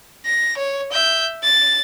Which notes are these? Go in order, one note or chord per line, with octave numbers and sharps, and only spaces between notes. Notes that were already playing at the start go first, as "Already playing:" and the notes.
A#6
C#5
E5 G6
A6